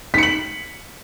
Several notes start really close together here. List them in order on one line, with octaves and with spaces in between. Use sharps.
B6 C#7 F#7